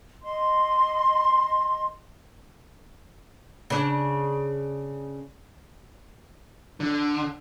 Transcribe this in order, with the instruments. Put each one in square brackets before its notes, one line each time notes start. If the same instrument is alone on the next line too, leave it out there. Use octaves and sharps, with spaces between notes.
[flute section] D#5 C6
[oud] C#3 D4
[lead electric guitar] D3